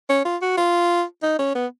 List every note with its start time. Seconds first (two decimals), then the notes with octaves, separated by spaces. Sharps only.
0.09 C#4
0.25 F4
0.42 F#4
0.58 F4
1.23 D#4
1.39 C#4
1.55 B3